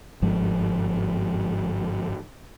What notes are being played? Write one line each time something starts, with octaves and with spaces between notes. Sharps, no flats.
G1 G#2 F3 G#3